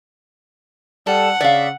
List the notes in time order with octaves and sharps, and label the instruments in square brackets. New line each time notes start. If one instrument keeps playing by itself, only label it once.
[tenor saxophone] G3 [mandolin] A4 [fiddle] F#5
[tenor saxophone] C#3 [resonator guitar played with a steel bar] D5 F5 [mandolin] E5